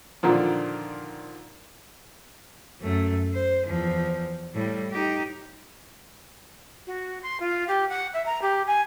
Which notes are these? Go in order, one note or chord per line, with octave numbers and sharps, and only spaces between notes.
A#2 D3 D#3 F3
F#2 A3
C5
E2 F3
A2 G3
D#4 G4
F#4
C6
F4
G4
F#5
E5
A#5
G4
G#5